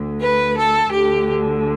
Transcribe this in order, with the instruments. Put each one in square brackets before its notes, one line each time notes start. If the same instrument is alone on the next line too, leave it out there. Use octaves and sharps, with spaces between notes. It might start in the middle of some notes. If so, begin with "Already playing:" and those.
Already playing: [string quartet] D2 D3
B4
A4
D2 D3 G4